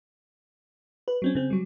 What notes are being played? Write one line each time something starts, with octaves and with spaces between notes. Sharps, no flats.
B4
F#3 C4 C#4
C#3 C4
F#3 G3